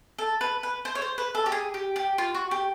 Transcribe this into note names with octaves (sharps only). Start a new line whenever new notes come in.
A4
B4
B4
C5
C#5
C5
B4
A4
G4
G#4
G4
G4
F4
F#4
G4